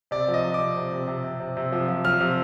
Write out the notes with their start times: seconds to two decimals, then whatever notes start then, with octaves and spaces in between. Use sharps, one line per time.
0.11 C3 D5
0.28 F3
0.34 D#5
0.44 C3
0.54 D6
0.60 C3
0.76 C3
0.92 C3
1.08 C3
1.24 C3
1.40 C3
1.57 C3
1.72 F3
1.88 F3
2.05 F3 F6
2.21 C3